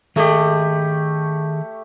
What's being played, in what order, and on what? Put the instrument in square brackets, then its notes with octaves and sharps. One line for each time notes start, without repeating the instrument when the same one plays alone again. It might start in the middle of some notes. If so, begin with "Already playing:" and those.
[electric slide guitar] D#3 G#4 D#5 [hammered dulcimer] A3 G4